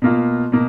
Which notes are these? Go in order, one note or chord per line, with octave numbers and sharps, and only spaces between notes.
B2 A#3 F4
B2 A#3